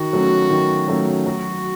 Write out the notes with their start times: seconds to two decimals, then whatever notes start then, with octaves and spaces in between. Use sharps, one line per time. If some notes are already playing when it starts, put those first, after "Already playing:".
Already playing: D#3 F#4
0.13 F#3 A3 C#4
0.51 D#3
0.88 F#3 A3 C#4
1.26 F#3 F#4